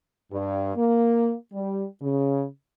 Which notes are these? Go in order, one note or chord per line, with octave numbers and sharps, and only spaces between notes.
G2
A#3
G3
C#3